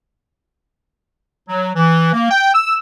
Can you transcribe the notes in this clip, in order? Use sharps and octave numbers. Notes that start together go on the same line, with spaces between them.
F#3
E3
A#3
G5
E6